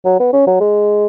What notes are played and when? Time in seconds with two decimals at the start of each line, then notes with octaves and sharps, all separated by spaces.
0.05 F#3
0.20 B3
0.33 C#4
0.47 F#3
0.60 G#3